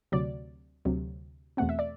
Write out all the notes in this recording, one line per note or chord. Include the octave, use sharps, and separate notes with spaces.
D2 C3 F#3 D5
D2 C3 F#3
E2 B2 A3 C4 F#5
E5
D5